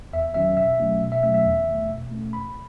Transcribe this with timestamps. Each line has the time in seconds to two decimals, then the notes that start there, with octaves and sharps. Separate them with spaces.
0.13 E2 E5
0.34 D#3 F#3 C#4 E5
0.57 B2 E5
0.80 F#3 A3 C#4
1.01 B2
1.12 E5
1.23 F#3 A3 C#4 E5
1.34 E5
1.45 E2
1.67 D#3
1.72 A3
1.89 B2
2.11 A3 C#4
2.33 E2 B5